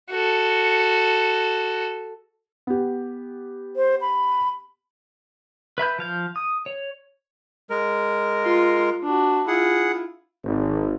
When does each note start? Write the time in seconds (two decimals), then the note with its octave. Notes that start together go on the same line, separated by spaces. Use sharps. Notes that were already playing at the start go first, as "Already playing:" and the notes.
0.10 F#4 A4
2.67 B3 G4
3.76 C5
4.01 B5
5.78 B4 E5 B5 G6
5.99 F3 F5 G6
6.36 D#6
6.66 C#5
7.70 G#3 A#4
8.43 F4 C6
9.03 D4 F#4
9.48 E4 F4 G#4 F#5
10.44 G#1